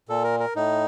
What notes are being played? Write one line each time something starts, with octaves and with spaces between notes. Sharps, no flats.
A#2 A4
A#4
A#4
A2 D#4